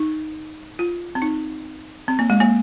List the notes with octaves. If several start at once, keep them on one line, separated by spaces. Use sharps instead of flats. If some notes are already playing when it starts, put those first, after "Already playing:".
Already playing: D#4
F4
C4
D#4
C4
A#3
G#3
A#3